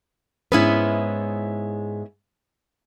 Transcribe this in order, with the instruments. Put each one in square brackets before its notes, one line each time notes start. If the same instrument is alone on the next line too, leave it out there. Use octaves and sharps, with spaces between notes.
[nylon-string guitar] G#2 G#3 B4 [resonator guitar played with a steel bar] B3 C#4 E4